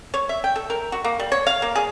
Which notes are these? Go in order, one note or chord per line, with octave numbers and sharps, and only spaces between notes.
C#5
E5
G5
A4
A#4
F#4
A#3
G3
C#5
F5
A#3
G#4